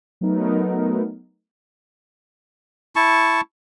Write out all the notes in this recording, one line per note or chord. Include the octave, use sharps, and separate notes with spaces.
F#3 A3 B3 D#4 A#4
E4 A5 C#6